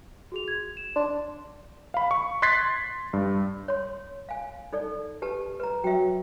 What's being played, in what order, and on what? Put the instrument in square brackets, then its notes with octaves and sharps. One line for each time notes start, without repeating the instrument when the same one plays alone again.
[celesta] F#4 G#4 F7
G#6
E7
[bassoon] D4 [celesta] C6
[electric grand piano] F5 B5
C#6
C6 F#6 G#6 A6 B6 C7
G2
[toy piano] C#5 C6
F5 G#5
D#4 A4 D5
G4 B4 A5
B4 A#5
[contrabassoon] F#3 [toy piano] E5 G5